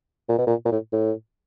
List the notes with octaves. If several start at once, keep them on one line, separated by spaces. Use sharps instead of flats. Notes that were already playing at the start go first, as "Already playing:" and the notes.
A#2
B2
A#2
A#2
A2
A2